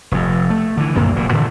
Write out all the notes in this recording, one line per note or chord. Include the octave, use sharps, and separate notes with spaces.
F1 F2
A3
D3 E3
C2 F#2 A#2 A#3
F1 A#2
G2 A#2 D3 E3